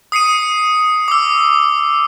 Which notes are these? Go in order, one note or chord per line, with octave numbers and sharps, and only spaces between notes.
D#6 C7 C#7 D#7
D6 E6